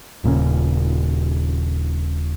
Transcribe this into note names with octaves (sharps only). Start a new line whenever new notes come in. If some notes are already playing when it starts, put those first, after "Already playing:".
D#1 A#2 C#3 C#4